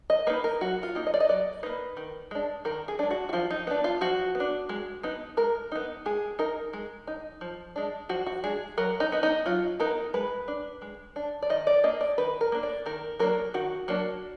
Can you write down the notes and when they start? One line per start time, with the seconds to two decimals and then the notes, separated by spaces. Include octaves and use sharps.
0.10 D#5
0.27 A#3 D#4 B4
0.44 A#4
0.61 F#3 F#4
0.83 F4
0.95 A#3 D#4
1.07 D#5
1.14 D5
1.20 D#5
1.29 F#3 D5
1.63 A#3 D#4 B4
1.97 D#3
2.31 G#3 D4
2.65 D#3 A#4
2.88 G#4
2.99 G#3 D4
3.10 F#4
3.29 F#4
3.33 F3 F4
3.51 D#4
3.67 B3 D4
3.84 F4
4.01 F3 F#4
4.35 B3
4.40 D4
4.69 G#3
5.03 B3 D#4
5.37 G#3 A#4
5.72 B3 D#4
6.06 G#3 G#4
6.39 D#4 A#4
6.73 G#3
7.07 D#4
7.41 F3
7.76 G#3 D4
8.09 F3 F#4
8.27 F#4
8.44 G#3 D4 G#4
8.78 F#3 A#4
9.00 D#4
9.12 B3 D#4
9.23 D#4
9.46 F#3 F4
9.80 B3 D#4 A#4
10.14 G#3 B4
10.48 D4
10.82 G#3
11.16 D4
11.42 D5
11.50 D#3 D#5
11.67 D5
11.84 A#3 D4 D#5
12.01 D5
12.18 D#3 B4
12.41 A#4
12.52 A#3 D4
12.63 D5
12.86 D#3 A#4
13.19 F#3 A#3 D4 A#4
13.54 D#3 F#4
13.88 F#3 A#3 D4